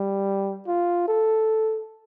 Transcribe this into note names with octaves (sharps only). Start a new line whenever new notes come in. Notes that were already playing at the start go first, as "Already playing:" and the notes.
Already playing: G3
F4
A4